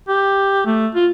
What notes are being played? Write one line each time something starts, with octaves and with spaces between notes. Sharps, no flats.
G4
A3
F4